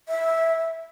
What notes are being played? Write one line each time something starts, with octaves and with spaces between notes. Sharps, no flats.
E5